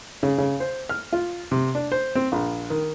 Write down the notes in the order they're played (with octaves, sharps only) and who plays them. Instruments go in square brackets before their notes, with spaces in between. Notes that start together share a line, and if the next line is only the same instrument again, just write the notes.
[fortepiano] C#3
C#3
C5
F6
F4
C3
D4
C5
C4
A#1
D#3